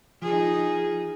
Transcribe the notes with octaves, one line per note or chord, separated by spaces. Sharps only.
F3 D#4 G#4